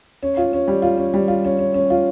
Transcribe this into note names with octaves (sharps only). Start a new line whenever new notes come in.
C#4
F4
C#4
G3
F4
C#4
G3
F4
C#4
C#4
C#4
F4